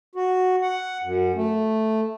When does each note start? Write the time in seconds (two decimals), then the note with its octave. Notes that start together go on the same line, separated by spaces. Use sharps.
0.15 F#4
0.62 F#5
1.03 F#2
1.35 A3